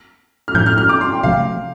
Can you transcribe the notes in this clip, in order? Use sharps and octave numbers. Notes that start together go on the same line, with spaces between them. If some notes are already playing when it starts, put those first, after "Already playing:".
F6
A2 F3 A3 D4 G6
F6
F6
D6
C6
G5
C3 F3 A3 F5